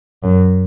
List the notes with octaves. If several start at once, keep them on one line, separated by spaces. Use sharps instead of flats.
F#2